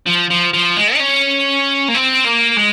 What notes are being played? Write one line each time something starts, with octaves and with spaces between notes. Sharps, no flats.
F3
F3
F3
G#3
D#4
C#4
A#3
C4
A#3
G#3